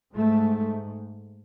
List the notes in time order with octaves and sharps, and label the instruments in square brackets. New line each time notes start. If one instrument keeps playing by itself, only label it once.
[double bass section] G#2 A3